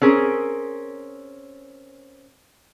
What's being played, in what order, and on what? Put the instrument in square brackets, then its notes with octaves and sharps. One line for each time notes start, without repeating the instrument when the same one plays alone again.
[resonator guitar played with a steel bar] C4 C#4 G#4 A#4